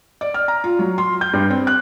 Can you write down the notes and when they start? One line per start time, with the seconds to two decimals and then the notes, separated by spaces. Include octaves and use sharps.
0.21 D5
0.34 F6
0.48 A#5
0.64 F4
0.79 F#3
0.98 C6
1.21 G6
1.33 G2
1.50 C4
1.67 F#6